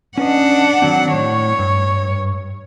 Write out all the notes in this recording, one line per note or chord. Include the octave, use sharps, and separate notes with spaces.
C#4 D4 B4 D#5 F#5
D#3 F#3 C4
A2 C#5
G2